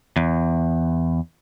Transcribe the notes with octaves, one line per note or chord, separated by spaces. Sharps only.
E2